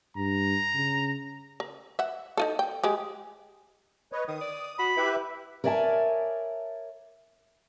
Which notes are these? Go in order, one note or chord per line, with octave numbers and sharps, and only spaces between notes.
G2 A#5
C#3
A#4
E5 F#5
D#4 F4 A4
G5
G#3 G4 G#4
B4 C#5 D#5
D#3 D#6
D5
F#4 B5
E4 G4 B4 E5
A#4 C#5 D5 E5 G#5 A5